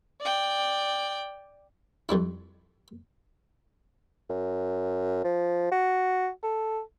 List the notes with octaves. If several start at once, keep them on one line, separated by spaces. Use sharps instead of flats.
D5 G5
F2 G3 D4 E4
F#2
F3
F#4
A4